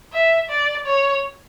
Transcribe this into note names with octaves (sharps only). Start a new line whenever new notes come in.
E5
D5
C#5